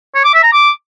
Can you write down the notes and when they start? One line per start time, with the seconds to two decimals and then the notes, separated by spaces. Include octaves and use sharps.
0.15 C#5
0.24 D6
0.34 E5
0.44 A#5
0.53 D6